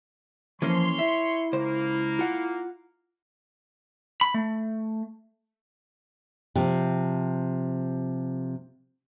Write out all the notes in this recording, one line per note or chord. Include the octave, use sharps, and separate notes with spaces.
E3 F3 A#3 C#4 C#5 C6
E4 E5
C#2 A#3 C5
F4 F#5
B5
A3
C3 F3